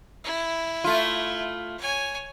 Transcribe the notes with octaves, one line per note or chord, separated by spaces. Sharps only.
E4
A3 F4
C#5 G#5